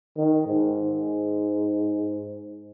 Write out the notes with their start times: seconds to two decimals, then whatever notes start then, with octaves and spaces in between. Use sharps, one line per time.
0.18 D#3
0.47 G#2